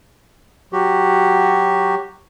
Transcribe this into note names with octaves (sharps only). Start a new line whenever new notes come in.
F#3 F#4 G4